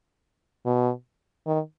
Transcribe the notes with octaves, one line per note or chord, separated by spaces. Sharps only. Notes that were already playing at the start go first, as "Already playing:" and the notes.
B2
D#3